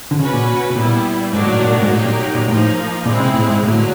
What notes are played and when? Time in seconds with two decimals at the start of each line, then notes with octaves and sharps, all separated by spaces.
0.11 D3
0.18 C#3 C#4 F#4 B4
0.33 A#2
0.70 B2
0.76 A#2 G3 B3 E4
1.33 G#2 D#3 F#3 A#3 D4 F#4
1.47 A2
1.62 A#2
1.72 A2
1.82 G#2
1.90 A2 F#3 A#3 D#4 G4
2.05 A#2
2.34 A#2
2.48 A2 F3 A#3 D#4
3.06 A#2 G#3 C4 E4
3.20 C3
3.34 A2
3.48 G#2
3.63 A2 D3 F#3 A#3